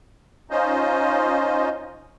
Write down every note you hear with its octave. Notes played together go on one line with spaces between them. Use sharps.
C#4 D#4 F4 C5 D#5